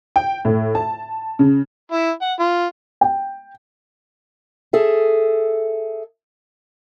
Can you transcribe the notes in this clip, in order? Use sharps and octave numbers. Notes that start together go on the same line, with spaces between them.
G5
A2
A5
C#3
E4
F#5
F4
G5
G#4 A4 E5